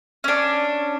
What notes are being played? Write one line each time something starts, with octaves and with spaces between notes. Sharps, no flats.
C#4 D4